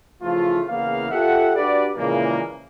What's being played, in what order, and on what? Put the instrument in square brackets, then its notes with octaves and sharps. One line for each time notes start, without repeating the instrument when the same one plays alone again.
[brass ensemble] C#3 E3 F3 A3 F4
E2 C#3 E3 A#3 B3 F5
F4 G4 A4 E5 F#5
D4 F#4 G4 B4 D5
A#2 C#3 E3 F3 G#3 A#3